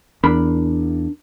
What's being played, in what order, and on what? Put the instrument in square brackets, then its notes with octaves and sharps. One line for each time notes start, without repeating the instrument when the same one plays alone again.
[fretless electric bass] E2 [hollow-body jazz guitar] D4 A#4 B5